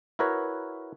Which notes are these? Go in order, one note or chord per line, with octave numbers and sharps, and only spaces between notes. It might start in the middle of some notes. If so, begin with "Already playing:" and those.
E4 F#4 A#4 B4 C#5